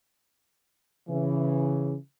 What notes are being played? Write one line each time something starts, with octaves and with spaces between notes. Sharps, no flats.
C#3 E3